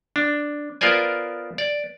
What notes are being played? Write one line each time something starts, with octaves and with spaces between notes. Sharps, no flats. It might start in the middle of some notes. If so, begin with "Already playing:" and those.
D4
B3 F4 A#4 C5 D5 G#5
D5